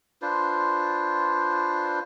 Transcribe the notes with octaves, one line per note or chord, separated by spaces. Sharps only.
D4 F4 B4 C5